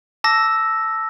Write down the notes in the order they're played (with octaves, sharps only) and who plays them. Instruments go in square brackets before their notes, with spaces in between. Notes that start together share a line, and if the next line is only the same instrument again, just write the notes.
[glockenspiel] A5 D6 E6 A#6